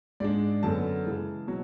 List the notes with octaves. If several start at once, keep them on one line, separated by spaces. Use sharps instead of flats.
G#2 G#3 D4 D5
F#2 D3 F#3 B3 A5
C#3 E3 G#3
B2 F#3